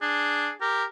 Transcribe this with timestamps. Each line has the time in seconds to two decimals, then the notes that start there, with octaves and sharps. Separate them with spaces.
0.02 D4 G#4
0.61 G4 A#4